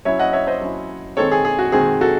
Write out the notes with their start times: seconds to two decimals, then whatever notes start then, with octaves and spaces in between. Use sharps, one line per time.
0.05 F#3 C#4 E4 C#5 E5
0.19 D#5 F#5
0.33 C#5 E5
0.47 C5 D#5
0.61 F#3 C#4 E4
1.17 D#3 G#3 C4 A4 C#5
1.32 G#4
1.45 G#4
1.59 F#4
1.72 D#3 G#3 C4 G#4
2.01 F#4 A4